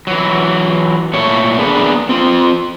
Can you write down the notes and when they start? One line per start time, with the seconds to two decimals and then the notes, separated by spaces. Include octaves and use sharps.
0.07 E3 F#3
1.13 A#2 A3 C#5
1.58 A#3 B3 D4 G#4
2.09 C4 F4